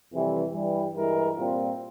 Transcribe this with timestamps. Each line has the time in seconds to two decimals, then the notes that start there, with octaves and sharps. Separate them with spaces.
0.11 F2 C3 E3 G3
0.53 G2 E3 G3
0.95 G2 E3 G#3 E4 A#4
1.38 A#2 G3 C4 F4